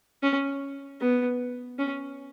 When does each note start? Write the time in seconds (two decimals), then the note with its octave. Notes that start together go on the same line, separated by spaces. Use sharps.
0.23 C#4
1.01 B3
1.78 C#4